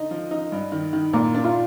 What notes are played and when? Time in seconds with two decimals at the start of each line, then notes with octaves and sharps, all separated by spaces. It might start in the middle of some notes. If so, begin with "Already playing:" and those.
Already playing: D3 D#4
0.11 F3
0.31 D#4
0.52 G2
0.72 D#3
0.93 D#3
1.13 A#2 A#3
1.34 D4
1.44 F4